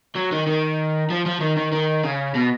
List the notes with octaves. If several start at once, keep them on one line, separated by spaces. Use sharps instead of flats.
F#3
D#3
D#3
F3
F3
D#3
D#3
D#3
C#3
B2